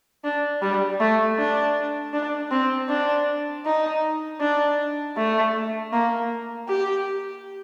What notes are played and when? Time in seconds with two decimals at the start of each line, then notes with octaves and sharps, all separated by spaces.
0.24 D4
0.62 G3
1.00 A3
1.38 D4
2.14 D4
2.51 C4
2.89 D4
3.65 D#4
4.40 D4
5.17 A3
5.93 A#3
6.69 G4